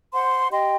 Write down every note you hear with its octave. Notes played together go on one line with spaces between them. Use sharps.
C5 F#5 C6
G4 D#5 G5 C6